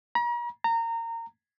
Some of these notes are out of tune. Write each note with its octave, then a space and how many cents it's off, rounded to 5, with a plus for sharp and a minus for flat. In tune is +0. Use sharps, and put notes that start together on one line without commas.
A#5 +40
A#5 -25